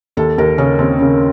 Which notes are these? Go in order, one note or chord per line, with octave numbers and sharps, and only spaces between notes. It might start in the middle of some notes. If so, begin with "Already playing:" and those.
D#2 A4
D#2 A#4
C#3 C#4
D#2 C4
C#3 C#4